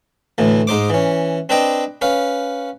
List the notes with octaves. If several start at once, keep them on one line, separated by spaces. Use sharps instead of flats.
D2 A2 E3
G#2 D#4 C5 D6
E3 C#4
C4 D4 B4 D#5 G5
C#4 B4 F5